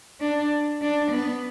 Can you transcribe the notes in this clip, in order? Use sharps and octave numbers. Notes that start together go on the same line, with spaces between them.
D4
D4
B3